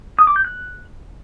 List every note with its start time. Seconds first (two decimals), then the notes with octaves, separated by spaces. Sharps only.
0.19 D#6
0.27 D6
0.36 G6
0.45 F#6